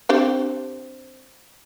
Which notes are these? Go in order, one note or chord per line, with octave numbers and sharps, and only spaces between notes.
C4 D4 G4